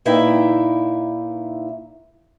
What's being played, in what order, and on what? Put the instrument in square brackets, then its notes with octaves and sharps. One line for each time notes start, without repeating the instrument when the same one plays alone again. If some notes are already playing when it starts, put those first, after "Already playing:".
[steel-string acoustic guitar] A#2 D#4 E4 B4 E5 G5